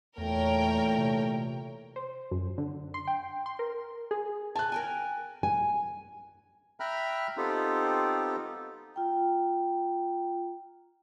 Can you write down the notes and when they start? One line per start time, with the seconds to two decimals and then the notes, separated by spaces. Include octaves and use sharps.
0.18 E2 A#2 E3 A3 A#4 C#5 G5
0.98 C3
1.96 C5
2.31 F#2
2.58 D3
2.94 C6
3.08 G5
3.46 C6
3.59 A#4
4.11 G#4
4.55 G#5 A5 F#6
4.72 A#4 G5 G#5
5.43 G#5
6.80 E5 G5 A#5 B5 F6 F#6
7.37 B3 C4 D#4 F4 G4 A4
8.94 F4 G5 A#5